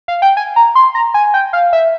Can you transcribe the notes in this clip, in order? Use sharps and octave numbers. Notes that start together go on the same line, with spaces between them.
F5
G5
G#5
A#5
C6
A#5
G#5
G5
F5
E5